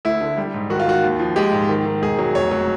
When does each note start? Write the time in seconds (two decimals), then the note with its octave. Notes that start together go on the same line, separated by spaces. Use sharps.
0.05 D2 E4
0.21 D3
0.37 G3
0.54 G#2
0.70 D#3 F#4
0.80 F4
0.87 D#3 F#4
1.03 D#2
1.20 F3
1.36 G#3 G4
1.53 G#2
1.69 D#3
1.85 D#3
2.02 E1 G#4
2.19 F#3
2.35 F1 C#5
2.51 F#3